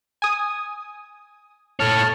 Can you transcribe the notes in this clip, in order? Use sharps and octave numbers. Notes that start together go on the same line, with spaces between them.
G#5 D#6
A4 C#5 A5 F6